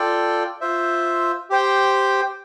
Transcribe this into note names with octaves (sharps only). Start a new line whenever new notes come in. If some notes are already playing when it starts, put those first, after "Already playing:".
Already playing: F4 A4 D5 G5
F4 C5 E5
G4 C5 G5